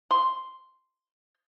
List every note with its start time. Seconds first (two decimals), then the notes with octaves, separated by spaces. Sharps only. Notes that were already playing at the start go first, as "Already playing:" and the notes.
0.11 C6